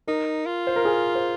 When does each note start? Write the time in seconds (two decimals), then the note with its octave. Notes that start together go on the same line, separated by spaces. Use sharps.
0.07 D#4 A#4
0.46 F4
0.67 C5
0.76 A#4
0.85 G#4
1.15 C5